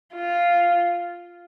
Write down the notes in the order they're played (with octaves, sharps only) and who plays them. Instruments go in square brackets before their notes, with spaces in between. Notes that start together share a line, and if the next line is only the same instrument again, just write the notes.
[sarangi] F4